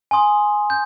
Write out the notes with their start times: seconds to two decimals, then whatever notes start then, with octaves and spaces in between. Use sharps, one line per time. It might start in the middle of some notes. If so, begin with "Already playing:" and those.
0.11 G#5 C6 D#6
0.70 G6